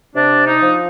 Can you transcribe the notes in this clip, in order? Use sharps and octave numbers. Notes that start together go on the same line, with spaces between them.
C3 D4
D#4
F3